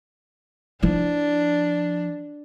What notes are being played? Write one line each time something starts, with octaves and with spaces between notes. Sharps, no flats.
F3 D4 E4